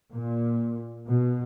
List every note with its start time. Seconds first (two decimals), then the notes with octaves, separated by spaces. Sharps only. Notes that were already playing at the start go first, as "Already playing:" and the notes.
0.12 A#2
1.07 B2